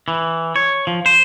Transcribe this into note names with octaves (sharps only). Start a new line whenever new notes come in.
E3
C#5
F3
C5